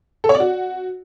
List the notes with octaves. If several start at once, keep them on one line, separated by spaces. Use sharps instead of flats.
A4
C#5
D5
F#4